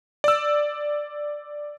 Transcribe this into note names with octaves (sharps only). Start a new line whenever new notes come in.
D5 E6